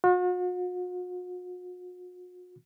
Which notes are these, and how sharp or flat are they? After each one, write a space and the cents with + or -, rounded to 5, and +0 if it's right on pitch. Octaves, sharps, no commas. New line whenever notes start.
F#4 -45